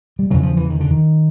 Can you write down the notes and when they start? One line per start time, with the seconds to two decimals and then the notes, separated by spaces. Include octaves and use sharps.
0.19 G3
0.30 E2 C#3 F#3
0.43 F3
0.57 E3
0.70 D#3
0.80 D3
0.91 D#3